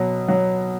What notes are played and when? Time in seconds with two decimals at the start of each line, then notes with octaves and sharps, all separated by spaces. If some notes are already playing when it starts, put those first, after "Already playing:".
Already playing: B2 F#3
0.28 F#3